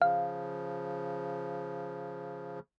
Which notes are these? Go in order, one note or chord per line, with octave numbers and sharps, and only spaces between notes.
C#3 F3 F5